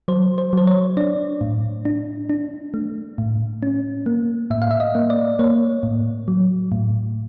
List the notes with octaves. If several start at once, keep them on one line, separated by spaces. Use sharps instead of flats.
F#3 C5
C5
F#3 C5
C#5
D4 D5
A2
D4
D4
A3
A2
C#4
A#3
A2 E5
F5
E5
D#5
A#3
D5
A#3 C#5
A2
F#3
A2